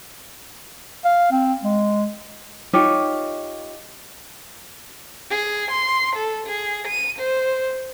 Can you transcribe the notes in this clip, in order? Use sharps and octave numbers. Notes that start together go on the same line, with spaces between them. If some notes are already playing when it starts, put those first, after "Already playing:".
F5
C4
G#3
D#4 F4 G4 C#5
G#4
C6
A4
G#4
D#7
C5